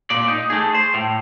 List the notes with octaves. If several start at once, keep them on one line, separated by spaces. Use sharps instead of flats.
A#2 D5
D#4
A3 G#4
C5
A2